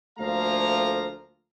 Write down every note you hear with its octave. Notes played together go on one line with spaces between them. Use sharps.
D2 F3 A3 A#3 F5 A#5